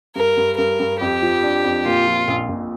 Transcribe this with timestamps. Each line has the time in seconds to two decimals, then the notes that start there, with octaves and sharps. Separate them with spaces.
0.16 G2 A#4
0.37 G2
0.58 G2 A#4
0.80 G2
1.01 F2 G4
1.22 F3
1.43 D4
1.65 F2
1.85 A#2 F4
2.07 F3
2.28 A#1
2.49 A#1